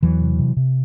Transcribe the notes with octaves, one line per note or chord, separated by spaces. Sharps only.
E2 E3 F#3
C3
C3
C3